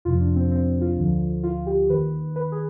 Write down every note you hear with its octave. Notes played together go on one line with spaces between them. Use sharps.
F2 C3 F3 F4
D4
C4
C4
F4
D2 D3 F3
F4
G4
D#2 D#3 B4
B4
G#4